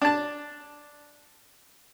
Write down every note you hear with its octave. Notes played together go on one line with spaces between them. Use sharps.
D4 A5